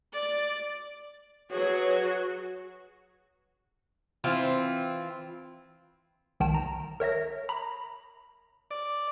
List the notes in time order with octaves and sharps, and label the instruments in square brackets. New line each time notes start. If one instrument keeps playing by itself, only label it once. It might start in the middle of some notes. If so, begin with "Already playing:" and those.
[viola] D5
[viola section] F#3 G#4 [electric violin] F#4 [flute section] B4 C#5
[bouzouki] E3 C4 F4
[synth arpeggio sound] C2 D#3 G5 A5 E7
A#5
A#4 C#5 E5 A#6
A#5 B5
[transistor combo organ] D5